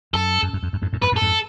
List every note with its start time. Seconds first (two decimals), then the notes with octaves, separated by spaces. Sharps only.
0.13 F#2 A4
0.42 F#2
0.53 F#2
0.63 F2
0.73 F#2
0.82 F2 G#2
0.93 F#2 A2
1.02 F2 G#2 B4
1.12 F#2 A2
1.16 A4
1.21 F2 G#2